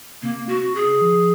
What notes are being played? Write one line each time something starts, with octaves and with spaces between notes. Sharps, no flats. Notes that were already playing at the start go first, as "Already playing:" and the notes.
C3 A#3
C3
F#4
C3
G#4
C#3
F3